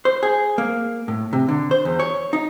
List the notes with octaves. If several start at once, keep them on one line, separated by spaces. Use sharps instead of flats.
C5
G#4
A#3
A2
C3
D3
C5
E2
C#5
D#4